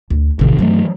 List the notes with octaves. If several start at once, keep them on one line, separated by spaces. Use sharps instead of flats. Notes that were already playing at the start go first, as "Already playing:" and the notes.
D2
E1 A1 C3 D#3
G2 D#3 E3 F#3 A3